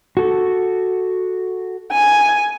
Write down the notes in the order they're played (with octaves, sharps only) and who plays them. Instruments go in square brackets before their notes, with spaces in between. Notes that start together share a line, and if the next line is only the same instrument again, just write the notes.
[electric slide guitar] F#4 A4
[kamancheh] G#5